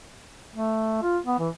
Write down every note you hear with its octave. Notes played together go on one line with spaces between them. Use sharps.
A3
F4
B3
E3